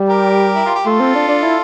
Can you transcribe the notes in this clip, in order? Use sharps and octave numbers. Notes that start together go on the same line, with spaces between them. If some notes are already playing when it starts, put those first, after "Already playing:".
Already playing: G3
G4 A#4
E4
F4
G4
A3 F4 A4
C4
D4
D4
E4